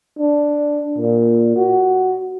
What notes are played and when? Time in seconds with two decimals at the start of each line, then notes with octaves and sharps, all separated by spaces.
0.19 D4
0.98 A#2
1.56 F#4